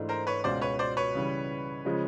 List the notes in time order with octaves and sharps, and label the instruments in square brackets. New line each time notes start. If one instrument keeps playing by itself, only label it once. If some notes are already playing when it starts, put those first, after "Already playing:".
Already playing: [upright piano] G#2 E3 A3 D4 F4
[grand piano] A#4 C5
B4 C#5
[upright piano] C#2 B2 G#3 C#4 F#4 [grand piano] C5 D5
[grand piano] B4 C#5
C5 D5
B4 C#5
[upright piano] C#3 E3 G3
C#3 F3 G#3 C#4